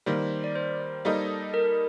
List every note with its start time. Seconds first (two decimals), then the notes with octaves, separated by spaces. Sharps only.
0.06 D#3 G3 A#3 C5
0.44 D5
0.56 C5
1.05 G3 A#3 D#4 A4 D#5
1.54 A#4